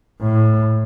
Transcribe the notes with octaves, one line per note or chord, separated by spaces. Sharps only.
A2